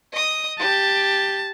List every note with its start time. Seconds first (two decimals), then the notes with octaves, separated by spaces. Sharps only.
0.12 D#5 D#6
0.59 G4 A5